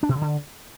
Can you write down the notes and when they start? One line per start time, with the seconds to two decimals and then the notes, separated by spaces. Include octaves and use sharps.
0.03 D4
0.09 B2
0.15 C#3
0.21 D3